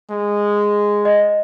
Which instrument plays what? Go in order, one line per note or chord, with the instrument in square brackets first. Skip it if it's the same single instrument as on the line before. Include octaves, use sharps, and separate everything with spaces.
[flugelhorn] G#3
[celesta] D#5